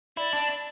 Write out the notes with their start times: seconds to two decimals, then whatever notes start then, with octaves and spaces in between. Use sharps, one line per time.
0.17 E4 D5
0.33 D4